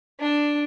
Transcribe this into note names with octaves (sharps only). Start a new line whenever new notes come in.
D4